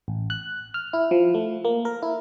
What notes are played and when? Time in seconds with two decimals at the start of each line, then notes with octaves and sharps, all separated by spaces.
0.08 A1
0.30 F#6
0.74 F6
0.93 E4
1.11 F3
1.34 A3
1.65 A#3
1.85 A#4
2.03 E4